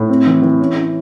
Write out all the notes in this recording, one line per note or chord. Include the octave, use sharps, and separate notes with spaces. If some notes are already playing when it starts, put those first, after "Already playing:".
Already playing: A2
C4
E3
E3
C#4
C#4